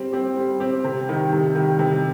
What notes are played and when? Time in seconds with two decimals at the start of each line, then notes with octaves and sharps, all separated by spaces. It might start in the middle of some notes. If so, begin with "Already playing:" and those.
Already playing: G3 C4 G4
0.13 C4 G4
0.37 G3
0.60 C4 G4
0.84 C3
1.08 D#3 G3
1.32 C3
1.55 D#3 G3
1.79 C3